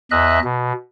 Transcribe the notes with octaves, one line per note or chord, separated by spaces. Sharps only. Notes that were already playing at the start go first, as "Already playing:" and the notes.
E2 D#5 E5 F#6
B2